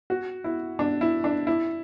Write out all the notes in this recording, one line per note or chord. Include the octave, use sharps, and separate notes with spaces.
F#4
E4
D4
E4
D4
E4